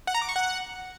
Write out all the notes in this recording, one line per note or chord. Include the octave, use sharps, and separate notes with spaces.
F#5
A#5
D6
C#6
F#5